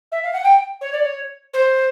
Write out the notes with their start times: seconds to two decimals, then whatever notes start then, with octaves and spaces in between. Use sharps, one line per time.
0.12 E5
0.23 F5
0.33 F#5
0.44 G5
0.81 C#5
0.92 D5
1.03 C#5
1.53 C5